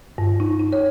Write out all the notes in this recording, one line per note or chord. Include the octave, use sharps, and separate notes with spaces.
G2
D#4
D#4
C#5